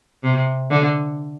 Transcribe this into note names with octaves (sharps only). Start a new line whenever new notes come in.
C3
D3